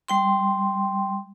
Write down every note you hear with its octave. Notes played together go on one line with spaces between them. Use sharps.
G3 G5 C6